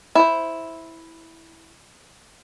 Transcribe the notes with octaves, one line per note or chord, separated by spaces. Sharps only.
E4 C5